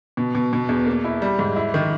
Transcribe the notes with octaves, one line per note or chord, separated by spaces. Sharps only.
B2
B2
B2
E2
A#3
E4
G3
G#2
E4
D#3